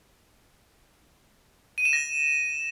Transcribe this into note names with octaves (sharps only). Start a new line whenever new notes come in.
D#7
E7
A#6